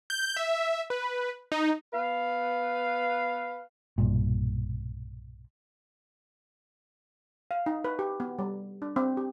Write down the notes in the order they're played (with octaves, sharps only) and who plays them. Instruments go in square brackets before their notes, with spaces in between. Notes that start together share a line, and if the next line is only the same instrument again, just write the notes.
[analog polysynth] G6
E5
B4
D#4
[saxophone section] B3 B4 F5
[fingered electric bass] B1 G2 A#2
[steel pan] F5
D#4
B4
G4
B3
G3
D4
C4
G4